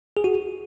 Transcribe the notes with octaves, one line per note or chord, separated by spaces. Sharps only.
G#4
F#4